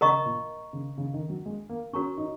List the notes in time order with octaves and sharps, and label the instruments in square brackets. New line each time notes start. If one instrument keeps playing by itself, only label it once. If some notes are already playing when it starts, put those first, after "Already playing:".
[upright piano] C#3 [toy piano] A#4 D#5 A#5 C#6
[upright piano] A#2
C#3
C#3
D#3
F#3
G#3
A#3
[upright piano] C#4 [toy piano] F#4 A#4 C#5 A#5 C#6
[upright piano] D#4